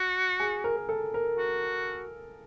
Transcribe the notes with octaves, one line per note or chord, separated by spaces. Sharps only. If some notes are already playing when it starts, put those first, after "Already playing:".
Already playing: F#4
G#4
A#4
A#4
A4
A#4
F#4